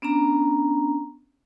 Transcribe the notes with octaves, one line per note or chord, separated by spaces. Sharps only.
B3 C#4 D4 A#5